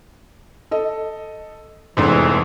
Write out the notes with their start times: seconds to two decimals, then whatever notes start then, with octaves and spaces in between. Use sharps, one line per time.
0.71 A4 D#5
1.97 F1 E2 G#2 E3 D4 A4 C6